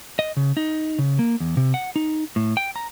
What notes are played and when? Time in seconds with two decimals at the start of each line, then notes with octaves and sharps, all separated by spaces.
0.19 D#5
0.37 C#3
0.57 D#4
0.99 C#3
1.19 A#3
1.40 E2
1.57 C3
1.74 F#5
1.96 D#4
2.36 A2
2.57 G5
2.76 A#5